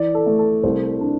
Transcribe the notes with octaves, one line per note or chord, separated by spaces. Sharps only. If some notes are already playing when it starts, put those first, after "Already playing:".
Already playing: E3 D5
A4
A3
A4
C2 C5
D4